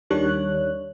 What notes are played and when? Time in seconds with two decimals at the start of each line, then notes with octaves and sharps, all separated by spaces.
0.10 D#2 D#3 G3 D4 C#5 F#6